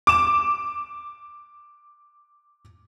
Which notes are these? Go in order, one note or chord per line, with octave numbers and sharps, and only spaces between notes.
D6 E7